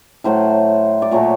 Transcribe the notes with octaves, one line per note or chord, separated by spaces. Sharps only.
A2 F#3 A3 C5
D5
A#2 F#3 A3 C#5